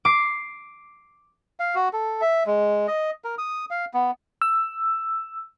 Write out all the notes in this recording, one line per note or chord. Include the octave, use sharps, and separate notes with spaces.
D6 C7
F5
F#4
A4
E5
G#3
D#5
A#4
D#6
F5
B3
E6